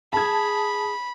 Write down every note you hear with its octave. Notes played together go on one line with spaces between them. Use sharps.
G#4 A5 B5 G#6